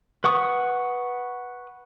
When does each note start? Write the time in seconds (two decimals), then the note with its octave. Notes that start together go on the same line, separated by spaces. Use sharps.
0.24 B4 F#5 C#6 D#6